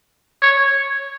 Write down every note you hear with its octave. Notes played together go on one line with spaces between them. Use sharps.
C#5